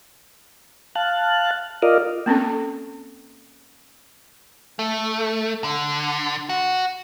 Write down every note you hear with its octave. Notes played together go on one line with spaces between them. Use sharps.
F5 A5 F#6
F4 A#4 D5 D#5 F5
A#3 C4 C#4 A4
A3
D3
F#4